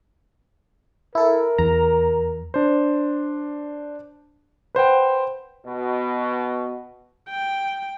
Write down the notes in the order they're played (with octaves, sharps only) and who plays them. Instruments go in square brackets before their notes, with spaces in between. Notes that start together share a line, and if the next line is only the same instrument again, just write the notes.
[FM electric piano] E4 A4 [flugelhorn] A#4
[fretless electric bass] E2 [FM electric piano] A#5
[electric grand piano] D4 C5
B4 C5 F#5 G5
[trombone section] B2
[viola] G5